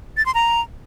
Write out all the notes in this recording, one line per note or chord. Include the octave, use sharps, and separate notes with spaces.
A6
C6
A#5